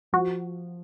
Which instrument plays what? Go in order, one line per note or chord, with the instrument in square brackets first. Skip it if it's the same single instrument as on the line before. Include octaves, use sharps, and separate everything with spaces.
[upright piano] F3 [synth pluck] F#4